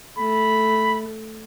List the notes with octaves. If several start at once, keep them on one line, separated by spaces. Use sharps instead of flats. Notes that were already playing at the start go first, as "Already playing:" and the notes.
A3 B5